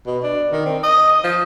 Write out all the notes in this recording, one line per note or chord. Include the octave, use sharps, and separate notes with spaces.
B2
D4
D#3
C4
D#5
F3